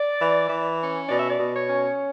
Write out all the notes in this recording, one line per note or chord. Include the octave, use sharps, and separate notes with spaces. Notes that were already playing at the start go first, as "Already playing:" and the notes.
Already playing: D5
E3
E3
C#4
B2 D5
E5
D5
B2
C#5
C#4